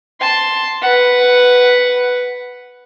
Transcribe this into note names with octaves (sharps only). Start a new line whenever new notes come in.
A5 C6
B4 F#5